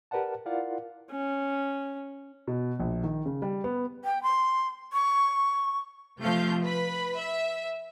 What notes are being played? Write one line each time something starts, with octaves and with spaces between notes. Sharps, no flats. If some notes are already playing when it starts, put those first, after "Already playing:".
G4 A#4 B4 D5 F#5 A5
E4 F4 A#4 D5 F5 F#5
C#4
B2
A#1
D#3
C#3
G3
B3
G5
C6
C#6
C3 F3 A3 F5 G6
B4 B5
E5